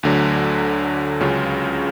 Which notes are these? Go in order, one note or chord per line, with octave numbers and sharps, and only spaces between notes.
D2 D3 F#3
C#2 C#3 F#3 C#4 F4